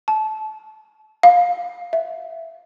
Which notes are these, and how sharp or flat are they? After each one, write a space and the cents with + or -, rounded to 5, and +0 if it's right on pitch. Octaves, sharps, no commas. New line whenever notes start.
A5 -25
F5 +20
E5 -5